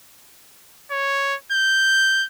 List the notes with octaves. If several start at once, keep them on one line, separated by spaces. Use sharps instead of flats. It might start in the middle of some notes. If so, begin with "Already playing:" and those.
C#5
G6